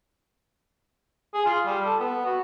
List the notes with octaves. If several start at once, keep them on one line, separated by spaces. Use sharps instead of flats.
G#4
F4
G3
A4
B3
F#4